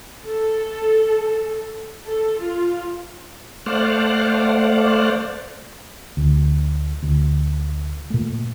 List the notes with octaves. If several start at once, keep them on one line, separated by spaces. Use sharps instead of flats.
A4
A4
F4
A3 C5 D5 F5 F#5
D2
D2
A#2 A3